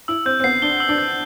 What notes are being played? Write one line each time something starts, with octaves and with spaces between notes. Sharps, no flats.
E4 E6
C4 G6
C4
B3 C7
D4 G7
E6
D4
G6